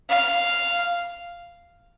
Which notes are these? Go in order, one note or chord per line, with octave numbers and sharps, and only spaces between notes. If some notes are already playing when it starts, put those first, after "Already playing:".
F5